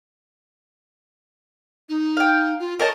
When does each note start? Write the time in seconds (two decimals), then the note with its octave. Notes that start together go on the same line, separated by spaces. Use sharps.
1.89 D#4
2.17 F5 G5
2.60 F4
2.79 A#4 C#5 D#5 A5